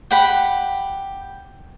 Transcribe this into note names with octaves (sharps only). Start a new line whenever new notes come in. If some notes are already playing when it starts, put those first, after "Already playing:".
G4 F#5 B5